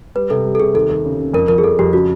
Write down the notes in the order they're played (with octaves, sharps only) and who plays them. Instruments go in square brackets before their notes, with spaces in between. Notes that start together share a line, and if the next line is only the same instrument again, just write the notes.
[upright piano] G3 [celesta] B4
[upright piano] C3 [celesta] A4
[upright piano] G3
[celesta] A4
[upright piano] C3 [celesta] G#4
[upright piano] D#2 [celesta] A4
[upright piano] D#2
C#3
C#3
[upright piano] F2 [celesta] A#4
[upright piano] F3 [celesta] A#4
[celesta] G#4
[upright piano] F2 [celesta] A4
[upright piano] F2 [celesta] G4
[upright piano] C#3 [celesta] F#4